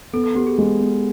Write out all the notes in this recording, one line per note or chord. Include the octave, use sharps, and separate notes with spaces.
B3 A4
A4
B3 G4
G#4
G#3
B3